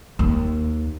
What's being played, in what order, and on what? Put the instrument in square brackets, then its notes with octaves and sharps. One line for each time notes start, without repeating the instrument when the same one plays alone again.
[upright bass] D#2